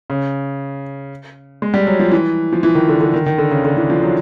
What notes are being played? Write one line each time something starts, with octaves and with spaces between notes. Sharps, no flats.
C#3
G#3
G3
F#3
F3
E3
F3
E3
D#3
D3
D3
D#3
D#3
D3
C#3
D3
E3
F3
F#3